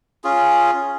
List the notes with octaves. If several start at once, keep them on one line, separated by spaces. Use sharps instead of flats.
C#4 F4 G#4